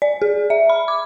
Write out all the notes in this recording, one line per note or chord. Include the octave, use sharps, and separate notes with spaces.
D5
G#4
E5
B5
D6